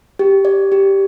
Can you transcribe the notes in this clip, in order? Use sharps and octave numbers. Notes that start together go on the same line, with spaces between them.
G4
D5
G4